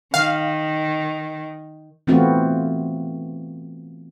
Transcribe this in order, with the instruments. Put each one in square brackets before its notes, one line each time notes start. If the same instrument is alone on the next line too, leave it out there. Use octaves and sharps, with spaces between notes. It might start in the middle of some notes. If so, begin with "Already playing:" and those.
[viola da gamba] D#3 [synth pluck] F5
[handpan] E3 A3 B3 C4 F4 F#4